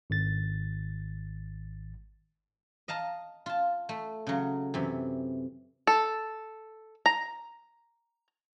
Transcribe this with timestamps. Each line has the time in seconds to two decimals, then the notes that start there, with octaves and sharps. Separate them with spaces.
0.10 G#1 A6
2.88 D#5 F5 A5 A#5
3.46 F4 A5
3.89 A3
4.27 C#3 F#3
4.74 F#2 C3 E3
5.87 A4
7.06 A#5